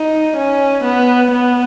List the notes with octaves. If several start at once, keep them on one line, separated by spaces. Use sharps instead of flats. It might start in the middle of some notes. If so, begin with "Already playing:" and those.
Already playing: D#4
C#4
B3
B3